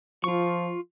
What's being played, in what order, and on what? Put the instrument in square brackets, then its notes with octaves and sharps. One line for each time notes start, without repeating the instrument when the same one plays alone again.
[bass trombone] F3 [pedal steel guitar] F4 C#6